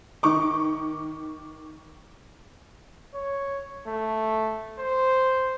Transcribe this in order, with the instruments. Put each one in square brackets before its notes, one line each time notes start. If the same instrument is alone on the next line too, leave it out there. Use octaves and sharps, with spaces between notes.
[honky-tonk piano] D#3 C#6 D6
[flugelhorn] C#5
A3
C5